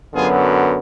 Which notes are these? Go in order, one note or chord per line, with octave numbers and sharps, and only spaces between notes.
F#2 D3 F#3 B3 F4 G#4